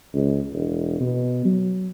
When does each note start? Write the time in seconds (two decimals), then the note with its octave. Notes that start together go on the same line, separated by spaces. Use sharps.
0.14 C#2
0.53 E1
1.00 B2
1.45 F#3